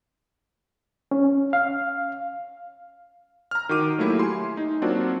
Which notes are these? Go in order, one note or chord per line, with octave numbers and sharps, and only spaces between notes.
C#4
F5
A#5 F6
D#3 F#4 D6 D#7
F#3 A3 A#3 E4 G4
G#5 C6
D#4
F#3 A#3 C4 D4 F4 F#4